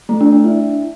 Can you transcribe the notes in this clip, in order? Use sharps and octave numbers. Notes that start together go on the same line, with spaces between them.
A3
D4
D4
E4